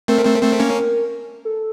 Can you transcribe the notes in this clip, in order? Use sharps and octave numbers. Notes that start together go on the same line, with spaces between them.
A3 C4 A#4
A3 C4
A3 C4
A#3 C#4
A4